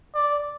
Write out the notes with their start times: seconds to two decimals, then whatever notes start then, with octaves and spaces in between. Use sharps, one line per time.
0.14 D5